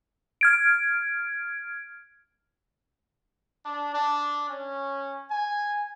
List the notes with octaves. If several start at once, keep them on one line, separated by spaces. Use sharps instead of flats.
F6 G#6 D7
D4
D4
C#4
G#5